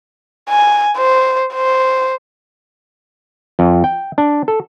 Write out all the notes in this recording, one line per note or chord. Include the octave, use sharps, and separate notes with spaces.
G#5
C5
C5
F2
G5
D4
A4